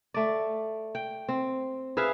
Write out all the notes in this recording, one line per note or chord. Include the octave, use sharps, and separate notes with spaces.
A3 D5
G5
C4
G#4 B4 E5 F5